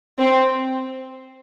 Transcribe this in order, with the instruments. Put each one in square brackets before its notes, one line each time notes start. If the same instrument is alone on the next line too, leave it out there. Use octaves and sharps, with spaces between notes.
[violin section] C4